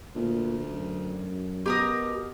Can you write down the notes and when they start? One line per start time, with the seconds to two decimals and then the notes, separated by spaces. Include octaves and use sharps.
0.15 D2 A#2
0.70 F#2
1.66 B2 G4 A#4 D#6